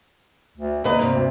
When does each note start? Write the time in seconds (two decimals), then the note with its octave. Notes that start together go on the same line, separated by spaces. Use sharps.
0.58 D2
0.84 D2 A#3 B4 D#5
0.99 G2 C3
1.13 D2